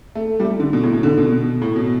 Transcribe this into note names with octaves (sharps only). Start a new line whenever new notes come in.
A3
G3
A3
D3
B2
A2
B2
D3
B2
B2
A2
B2